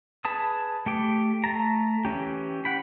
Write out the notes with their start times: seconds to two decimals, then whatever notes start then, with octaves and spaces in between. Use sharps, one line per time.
0.25 G#4 B4 A5 D#6
0.86 A3 G4 D6
1.44 A3 A5 A#5
2.05 E3 C#4 G4
2.65 F#5 G5 B5